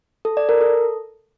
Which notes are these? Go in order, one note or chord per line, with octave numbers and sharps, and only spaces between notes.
A4
D5
A#4
A4